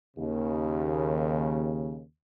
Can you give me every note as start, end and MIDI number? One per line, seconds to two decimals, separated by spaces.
0.17 2.02 39
0.17 2.02 49